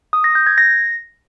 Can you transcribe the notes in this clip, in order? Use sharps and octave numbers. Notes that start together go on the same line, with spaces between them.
D#6
A#6
G6
G#6
A#6